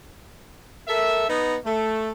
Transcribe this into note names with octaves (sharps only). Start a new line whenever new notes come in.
A4 A#4 E5
B3 D#4
A3